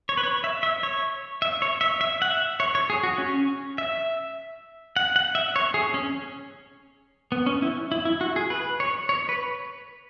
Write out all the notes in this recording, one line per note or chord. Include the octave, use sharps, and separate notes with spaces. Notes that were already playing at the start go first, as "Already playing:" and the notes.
C#5
B4
C#5
E5
E5
C#5
E5
C#5
E5
E5
F#5
E5
C#5
C#5
G#4
F#4
C#4
E5
F#5
F#5
E5
C#5
G#4
C#4
B3
C#4
E4
E4
E4
F#4
G#4
B4
C#5
C#5
B4